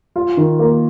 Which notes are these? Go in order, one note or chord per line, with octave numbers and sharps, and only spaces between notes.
F4
D#3
A#3